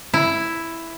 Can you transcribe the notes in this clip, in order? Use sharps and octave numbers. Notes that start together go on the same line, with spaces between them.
E4